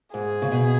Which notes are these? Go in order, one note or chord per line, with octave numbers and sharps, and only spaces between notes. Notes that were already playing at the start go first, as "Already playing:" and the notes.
G#2 G#4
C#3
B2